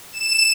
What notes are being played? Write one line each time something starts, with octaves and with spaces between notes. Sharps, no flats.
E7